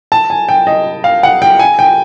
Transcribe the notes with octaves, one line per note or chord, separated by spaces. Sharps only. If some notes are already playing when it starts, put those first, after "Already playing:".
A5
G#5
G5
D#5
F5
F#5
G5
G#5
G5